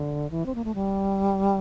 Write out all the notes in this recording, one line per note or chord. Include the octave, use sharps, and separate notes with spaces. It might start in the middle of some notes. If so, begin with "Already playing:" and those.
Already playing: D3
E3
C4
A#3
A3
G3